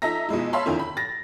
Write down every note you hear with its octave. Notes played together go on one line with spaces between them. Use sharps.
F3 D#4 A4 E5 A#5 A#6
B2 F3 G#3 E4
C#5 E5 F5 A5 B5 C6
E2 D3 D#3 F3 C#4 E4
B5
A6 A#6